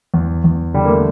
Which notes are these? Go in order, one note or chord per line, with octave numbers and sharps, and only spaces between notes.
E2
E2
D3 G3
A#3
A3